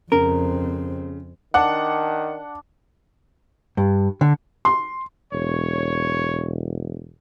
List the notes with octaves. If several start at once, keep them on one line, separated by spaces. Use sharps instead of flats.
F2 C#3 C4 A#4
D#3 D4 F#5
G2
D3
C6
E1 C#5